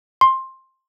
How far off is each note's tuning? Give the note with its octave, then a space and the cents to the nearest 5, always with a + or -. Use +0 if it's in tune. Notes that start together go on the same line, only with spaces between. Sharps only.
C6 +15